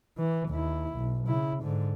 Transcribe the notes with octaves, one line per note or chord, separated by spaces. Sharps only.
E3
D#2 E4
B1
C#3 E4
G#2 D3